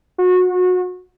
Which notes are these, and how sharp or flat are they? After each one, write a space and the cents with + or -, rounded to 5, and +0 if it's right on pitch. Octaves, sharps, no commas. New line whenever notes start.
F#4 -25